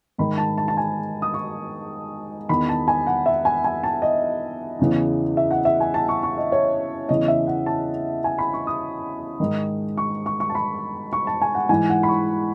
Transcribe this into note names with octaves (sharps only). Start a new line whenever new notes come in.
G#2 D#3 B5
A5
A5
A5
G#5
D#6
C#6
E2 D#3 B5
A5
G#5
F#5
E5
G#5
G#5
A5
D#5
E2 C#3 E3
E5
F#5
E5
G#5
A5
C#6
C#6
D#5
C#5
E2 C#3 E3 D#5
E5
F#5
A5
G#5
B5
C#6
D#6
G#2 D#3
C#6
C#6
C#6
A5
B5
C#6
A5
G#5
F#5
G#2 E3 G#5
F#5
B5
C#6